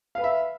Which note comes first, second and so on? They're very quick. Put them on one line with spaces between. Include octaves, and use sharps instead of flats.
F5 B4 B5 E5